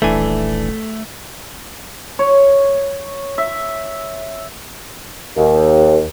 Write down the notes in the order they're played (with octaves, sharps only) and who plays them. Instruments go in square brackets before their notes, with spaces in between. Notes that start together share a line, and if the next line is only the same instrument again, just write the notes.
[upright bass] D#1 A#1 [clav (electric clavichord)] E3 D4 G#5 [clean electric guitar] A3
[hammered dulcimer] C#5
E5
[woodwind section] D#2